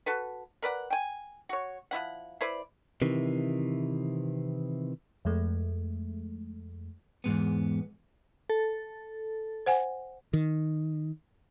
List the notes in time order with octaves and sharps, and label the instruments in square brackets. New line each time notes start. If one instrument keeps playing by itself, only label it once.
[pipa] F#4 A4 B4
A#4 B4 D5 F#5
G5 G#5
F#4 C#5
F3 C#4 E4 F#5
E4 B4 C5 D5
[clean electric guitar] C3 D#3 E3
[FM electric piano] F2 G#3 A3
[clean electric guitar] E2 G#2 B3
[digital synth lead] A4
[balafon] C5 F#5 G#5
[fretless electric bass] D#3